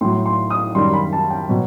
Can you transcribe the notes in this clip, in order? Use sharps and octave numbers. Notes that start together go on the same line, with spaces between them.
A2 F#3 C6
C6
D#6
F#2 D#3 G3 C6
B5
A5
G5
B2 F#3